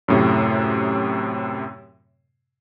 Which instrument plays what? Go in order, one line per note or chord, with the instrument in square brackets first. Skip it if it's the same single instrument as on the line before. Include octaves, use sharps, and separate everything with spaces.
[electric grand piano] F#2 A2 C3